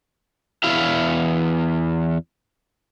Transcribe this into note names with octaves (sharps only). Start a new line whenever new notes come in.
E2 E4 F5